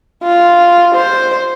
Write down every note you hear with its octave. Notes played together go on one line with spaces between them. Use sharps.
F4
C5